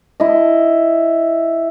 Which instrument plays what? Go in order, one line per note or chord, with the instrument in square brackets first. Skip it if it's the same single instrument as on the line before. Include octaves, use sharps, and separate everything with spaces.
[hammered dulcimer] E4 D#5